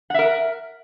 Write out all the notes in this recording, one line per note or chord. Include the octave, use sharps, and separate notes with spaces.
A#4 E5 F#5